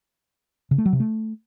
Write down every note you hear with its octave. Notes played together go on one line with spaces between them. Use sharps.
C#3
A3
F#3
C3
A3